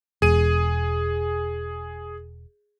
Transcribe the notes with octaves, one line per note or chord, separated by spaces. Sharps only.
E1 G#4 D#7